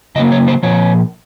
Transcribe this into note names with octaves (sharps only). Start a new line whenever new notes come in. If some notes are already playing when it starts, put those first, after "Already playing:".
C#3 F#3 A#3 D#5
C#5
C5
A#2 F3 C#5